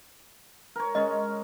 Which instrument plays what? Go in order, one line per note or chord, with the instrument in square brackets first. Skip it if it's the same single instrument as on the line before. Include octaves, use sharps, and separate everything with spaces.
[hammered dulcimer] A#4 C#5
[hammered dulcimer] G#3 C#4 C#6 [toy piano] D#5